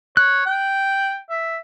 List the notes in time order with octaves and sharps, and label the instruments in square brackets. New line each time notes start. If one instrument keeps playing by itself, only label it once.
[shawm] C#5 [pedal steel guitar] F#6
[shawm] G5
E5